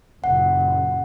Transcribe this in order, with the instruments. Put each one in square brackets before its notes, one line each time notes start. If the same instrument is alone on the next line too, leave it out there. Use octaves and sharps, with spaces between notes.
[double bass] F#1 A#2 [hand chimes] F#5